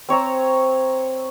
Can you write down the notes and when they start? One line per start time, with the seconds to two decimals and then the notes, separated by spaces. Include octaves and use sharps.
0.09 C4 C#5 A#5 E6